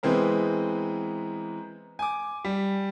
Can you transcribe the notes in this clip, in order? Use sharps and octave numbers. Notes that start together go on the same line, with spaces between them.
E3 G#3 B3 C4 A#4
G#5 D6
G3